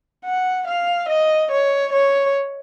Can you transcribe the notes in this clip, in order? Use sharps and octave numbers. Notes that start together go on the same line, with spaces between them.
F#5
F5
D#5
C#5
C#5